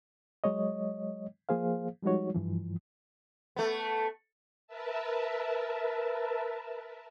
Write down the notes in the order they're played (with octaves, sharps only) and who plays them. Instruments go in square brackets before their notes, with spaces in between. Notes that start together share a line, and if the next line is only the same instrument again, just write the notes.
[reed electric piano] F#3 G#3 C#5 D#5
F3 A#3 G#4 C5 F5
F3 G3 G#3 D#4 F#4 C#5
G2 E3 F3
[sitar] A3 B3
[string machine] A#4 B4 E5 A5